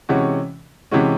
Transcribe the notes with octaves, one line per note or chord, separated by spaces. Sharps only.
C3 E3 G#3 C#4 F#4
C3 E3 G#3 C#4 F#4